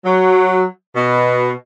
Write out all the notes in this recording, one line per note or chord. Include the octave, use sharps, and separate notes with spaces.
F#3
B2